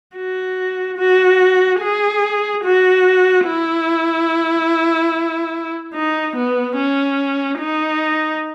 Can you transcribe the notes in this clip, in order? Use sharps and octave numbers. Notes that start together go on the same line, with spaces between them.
F#4
F#4
G#4
F#4
E4
D#4
B3
C#4
D#4